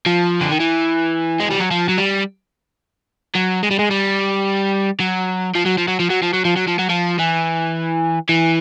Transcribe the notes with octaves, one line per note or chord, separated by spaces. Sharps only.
F3
D3
D#3
E3
G#3
G3
F#3
F3
F#3
G3
F#3
G#3
G3
G#3
G3
F#3
F3
F#3
F3
F#3
F3
F#3
F3
F#3
F3
F#3
F3
F#3
F3
E3
E3